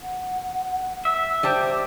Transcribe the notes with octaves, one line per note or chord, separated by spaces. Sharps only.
F#5
E5
G3 G4 C5 A5